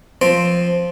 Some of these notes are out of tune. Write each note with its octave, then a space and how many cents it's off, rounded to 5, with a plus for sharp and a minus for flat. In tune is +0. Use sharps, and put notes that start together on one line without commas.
F3 +0 C4 +0 C5 +0